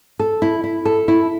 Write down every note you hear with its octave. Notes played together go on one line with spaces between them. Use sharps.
A4
E4
E4
A4
E4